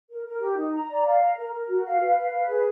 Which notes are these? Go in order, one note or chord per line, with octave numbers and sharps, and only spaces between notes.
A#4
A#4
G4
D#4
A#5
D5
F5
A#5
A#4
A#4
F#4
F5
B4
F5
B4
G#4